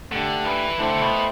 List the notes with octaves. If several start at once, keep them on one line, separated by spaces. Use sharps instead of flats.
D3 A3 D4 G4
E3
D3 A3 E4 A4 C5 G5
B2